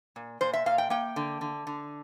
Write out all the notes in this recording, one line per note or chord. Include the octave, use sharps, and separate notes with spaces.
A#2
A#2 C5
E5
A#2 F5
G5
A#3 G5
D3
D3
D3